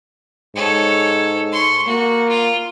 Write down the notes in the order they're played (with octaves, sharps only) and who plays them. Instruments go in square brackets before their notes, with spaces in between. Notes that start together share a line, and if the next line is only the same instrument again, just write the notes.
[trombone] G#2 [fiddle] A4 C#5
[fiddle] C6 C#6
[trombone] A#3 [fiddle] F#4
[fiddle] F4